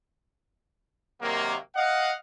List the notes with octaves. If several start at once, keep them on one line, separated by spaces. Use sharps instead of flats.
C3 D#3 F#3 A#3
D#5 F5 F#5